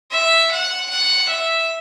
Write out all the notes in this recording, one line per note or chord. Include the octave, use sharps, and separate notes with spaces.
E5
F#5
F#5
E5